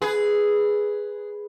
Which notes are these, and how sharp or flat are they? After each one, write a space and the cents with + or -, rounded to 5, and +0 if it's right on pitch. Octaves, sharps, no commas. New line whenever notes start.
G#4 +0 B4 +0